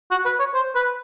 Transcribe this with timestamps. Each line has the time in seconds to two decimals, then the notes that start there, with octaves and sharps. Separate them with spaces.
0.11 F#4
0.25 B4
0.40 C#5
0.54 C5
0.75 B4